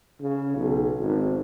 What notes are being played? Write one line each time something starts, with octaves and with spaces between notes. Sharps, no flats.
C#3
B1
G#1